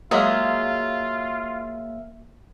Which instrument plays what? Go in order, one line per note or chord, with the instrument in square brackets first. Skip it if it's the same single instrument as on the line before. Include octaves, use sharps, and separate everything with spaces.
[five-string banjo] F#3 G#3 G#4 [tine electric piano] A#3 E5 F6 [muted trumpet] F4